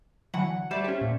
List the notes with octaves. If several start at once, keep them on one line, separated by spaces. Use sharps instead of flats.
D3 E3 F#3 F#5
G3 A3 C5 D5 A5
C#4 G4
A#2